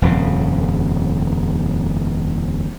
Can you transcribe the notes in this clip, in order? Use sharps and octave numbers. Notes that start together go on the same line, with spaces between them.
D#1 F2 C#3